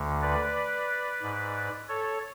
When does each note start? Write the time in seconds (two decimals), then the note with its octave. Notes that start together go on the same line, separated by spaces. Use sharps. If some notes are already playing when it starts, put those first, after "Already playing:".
Already playing: D2 D3
0.22 B4 D5
1.22 G#2
1.88 A4 C#5